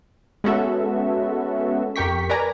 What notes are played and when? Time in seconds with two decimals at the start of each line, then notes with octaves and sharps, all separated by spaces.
0.44 G#3 B3 C#4 F#4 A4 E5
1.96 F2 G4 A#4 G5 C#6 B6
2.30 A#4 B4 D5 G#5 A#5